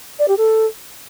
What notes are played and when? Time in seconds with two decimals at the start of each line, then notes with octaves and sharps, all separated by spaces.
0.19 D5
0.28 G4
0.37 A4